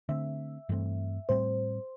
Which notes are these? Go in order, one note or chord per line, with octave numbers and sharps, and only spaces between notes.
D3 A3 C4 E5
G2 E3 A3 C4
A2 G3 C4 C5